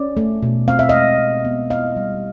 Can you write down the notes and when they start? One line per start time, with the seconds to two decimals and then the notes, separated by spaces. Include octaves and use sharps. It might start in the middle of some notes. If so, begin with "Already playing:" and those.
Already playing: C#4 D5
0.17 A3
0.42 B2
0.68 C4 F5
0.79 E5
0.89 G#3 D#5 F5
1.19 B2
1.45 B3
1.70 E4 D#5 F5
1.96 G3